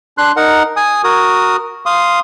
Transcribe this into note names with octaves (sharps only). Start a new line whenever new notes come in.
D4 C6 F#6
D#4 A#4 F#5
G#5 D#6
F#4 A#4 D#6
F5 C6 D#6